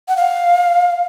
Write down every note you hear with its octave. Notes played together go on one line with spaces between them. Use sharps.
F#5
F5